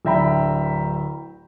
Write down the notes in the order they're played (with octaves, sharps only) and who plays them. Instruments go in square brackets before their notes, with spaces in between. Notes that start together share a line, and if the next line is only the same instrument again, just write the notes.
[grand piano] D1 D3 E5 G5 A#5 B5